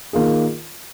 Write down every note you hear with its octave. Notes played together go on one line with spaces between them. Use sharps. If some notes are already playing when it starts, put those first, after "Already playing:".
D#3 A#3 F4 G#4